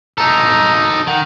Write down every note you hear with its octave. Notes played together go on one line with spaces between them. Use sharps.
D#4 A4 A#5
D#3 F#5